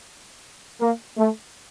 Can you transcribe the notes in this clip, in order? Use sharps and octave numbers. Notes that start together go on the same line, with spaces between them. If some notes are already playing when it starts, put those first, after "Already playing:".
A#3
A3